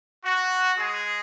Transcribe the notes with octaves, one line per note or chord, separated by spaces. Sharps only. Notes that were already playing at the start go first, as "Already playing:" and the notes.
F#4
G#3 G#4